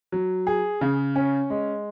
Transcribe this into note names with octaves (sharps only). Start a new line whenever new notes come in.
F#3
G#4
C#3
C#4
G#3